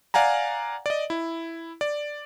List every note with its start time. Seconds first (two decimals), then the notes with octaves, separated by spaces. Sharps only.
0.14 D5 F5 F#5 G#5 A#5
0.86 D5 D#5
1.10 E4
1.81 D5